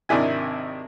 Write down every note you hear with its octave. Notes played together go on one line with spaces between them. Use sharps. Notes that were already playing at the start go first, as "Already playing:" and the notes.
G#1 C3 D#3 D4 E4 G#5